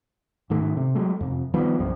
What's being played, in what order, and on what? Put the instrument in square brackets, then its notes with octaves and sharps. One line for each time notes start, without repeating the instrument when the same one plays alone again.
[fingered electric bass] G#2 D#3 A3
C3
F#3 G#3 A3
F2 C3
D#3 F3 G3 B3
C2 G2 F3 G3